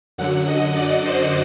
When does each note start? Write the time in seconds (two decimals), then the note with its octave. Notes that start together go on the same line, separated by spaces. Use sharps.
0.18 F#2 D3 F#3 F#5
0.48 D#5
0.76 D5
1.06 C5